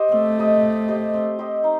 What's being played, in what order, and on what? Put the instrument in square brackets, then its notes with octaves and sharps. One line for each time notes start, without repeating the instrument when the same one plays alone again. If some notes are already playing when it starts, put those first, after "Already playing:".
Already playing: [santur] G4 C5 D#5
[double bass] A3 [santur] C4
[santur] G4 C5 D#5
C4
G4 C5 D#5
C4
G4 C5 D#5
D#4